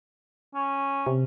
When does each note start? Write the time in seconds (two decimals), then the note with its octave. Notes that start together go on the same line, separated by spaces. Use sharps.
0.55 C#4
1.06 C3